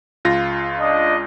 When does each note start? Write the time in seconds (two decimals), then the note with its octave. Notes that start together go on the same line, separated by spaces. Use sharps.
0.25 C#2 F4 A#6
0.79 D4 D#5